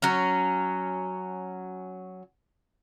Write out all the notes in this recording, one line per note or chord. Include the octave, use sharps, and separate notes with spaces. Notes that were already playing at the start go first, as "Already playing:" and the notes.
F#3 C#4